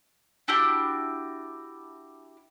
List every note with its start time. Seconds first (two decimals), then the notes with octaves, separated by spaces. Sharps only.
0.48 D4 E4 F#4 G4